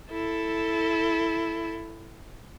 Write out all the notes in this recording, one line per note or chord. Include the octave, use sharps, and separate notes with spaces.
E4 A4